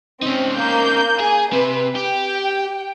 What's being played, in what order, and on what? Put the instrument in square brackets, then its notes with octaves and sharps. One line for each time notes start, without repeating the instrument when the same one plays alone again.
[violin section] C4 [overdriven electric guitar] C#4 D#4
[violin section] A#3 G6
[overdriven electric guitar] G#4 [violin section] G#5
[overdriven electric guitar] C3 [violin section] B4
[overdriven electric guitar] G4 [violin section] G5